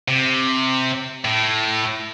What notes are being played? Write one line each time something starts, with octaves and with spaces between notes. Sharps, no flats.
C3
A2